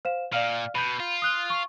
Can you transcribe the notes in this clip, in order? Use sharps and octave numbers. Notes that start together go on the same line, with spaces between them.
C5 F5 E7
A#2 D5 F5 F6
B2 B5 G6
F4
D#6 F#6 G7
C#6